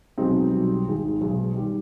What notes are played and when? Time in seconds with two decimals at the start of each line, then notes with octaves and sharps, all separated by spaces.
0.18 B1 B2 G#3 C4 D#4
0.52 B1 B2 G3
0.87 G#1 G#2 D#3 G#3
1.21 B1 B2 G#3
1.56 D#3 G3